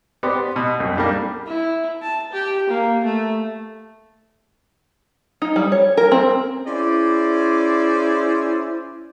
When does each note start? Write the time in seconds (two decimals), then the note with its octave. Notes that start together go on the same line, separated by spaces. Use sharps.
0.23 B3 C4 G4 D5
0.56 B2
0.80 C2 F#2
0.97 G3 A#3 D4 G4
1.46 E4
2.02 A5
2.32 G4
2.69 A#3
3.04 A3
5.42 D#4
5.56 G3
5.72 C#5
5.97 A#4
6.12 C4
6.66 C#4 E4 G#4 C5 D5